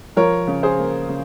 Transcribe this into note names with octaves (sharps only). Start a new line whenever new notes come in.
F3 A#4 C#5
C#3
G#4 C5
A#3
C#3